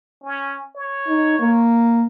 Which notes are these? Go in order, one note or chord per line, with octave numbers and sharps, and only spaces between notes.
C#4
C#5
D#4
A#3